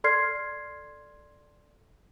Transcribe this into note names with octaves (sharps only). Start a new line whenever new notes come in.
A4 D5 C6 F6 G#6 C7